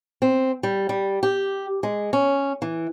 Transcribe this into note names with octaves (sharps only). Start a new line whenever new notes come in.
C4
G3
G3
G4
G#3
C#4
E3